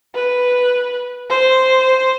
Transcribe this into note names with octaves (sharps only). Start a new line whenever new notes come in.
B4
C5